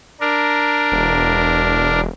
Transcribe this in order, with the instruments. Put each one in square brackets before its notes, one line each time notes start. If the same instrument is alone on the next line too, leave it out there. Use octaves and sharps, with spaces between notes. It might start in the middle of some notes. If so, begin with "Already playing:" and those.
[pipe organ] D4 A#4
[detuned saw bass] E1